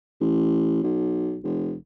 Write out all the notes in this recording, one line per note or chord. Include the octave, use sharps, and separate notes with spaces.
A1
B1
F1